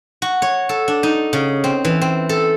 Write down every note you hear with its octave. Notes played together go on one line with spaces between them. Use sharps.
F#4
C#5
A4
D4
D#4
C#3
C4
E3
C4
A4